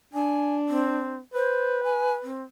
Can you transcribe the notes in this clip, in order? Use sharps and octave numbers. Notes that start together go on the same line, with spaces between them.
D4 G#5
C4
B4 C5
G#5
C4